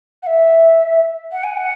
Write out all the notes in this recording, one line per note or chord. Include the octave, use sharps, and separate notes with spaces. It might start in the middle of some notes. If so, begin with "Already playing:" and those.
F#5
E5
F#5
G#5
F#5